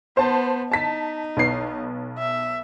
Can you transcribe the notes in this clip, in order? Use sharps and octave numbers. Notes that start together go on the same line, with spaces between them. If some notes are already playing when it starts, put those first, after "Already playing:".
B3 C5 A5
D#4 A5 B6
B1 B3 C7
E5